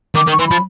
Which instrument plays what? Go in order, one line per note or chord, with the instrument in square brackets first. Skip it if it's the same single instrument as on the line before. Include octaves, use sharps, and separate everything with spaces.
[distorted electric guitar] D#3 [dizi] D6
[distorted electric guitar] D#3
[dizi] C#6
[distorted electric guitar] E3 [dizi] C6
[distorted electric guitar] F3 [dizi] B5